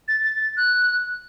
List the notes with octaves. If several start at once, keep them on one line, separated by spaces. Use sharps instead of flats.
A6
A6
A6
F#6